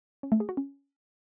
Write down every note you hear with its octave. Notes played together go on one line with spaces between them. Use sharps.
C#4
A3
G#4
F#4
C#4